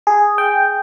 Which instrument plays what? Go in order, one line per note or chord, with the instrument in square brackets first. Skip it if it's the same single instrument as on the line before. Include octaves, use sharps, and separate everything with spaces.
[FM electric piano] G#4
G5